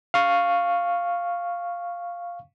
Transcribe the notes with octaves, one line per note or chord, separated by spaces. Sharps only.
F5 C#6